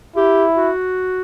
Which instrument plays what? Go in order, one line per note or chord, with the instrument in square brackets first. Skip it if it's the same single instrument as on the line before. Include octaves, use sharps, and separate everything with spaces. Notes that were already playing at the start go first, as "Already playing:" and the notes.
[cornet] E4 [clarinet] G4
[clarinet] F#4